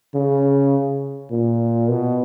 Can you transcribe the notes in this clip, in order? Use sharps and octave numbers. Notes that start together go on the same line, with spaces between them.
C#3
A#2
B2